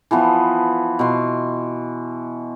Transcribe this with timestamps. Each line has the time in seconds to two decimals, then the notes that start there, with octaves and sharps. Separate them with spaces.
0.11 E3 F3 B3
0.99 B2 C6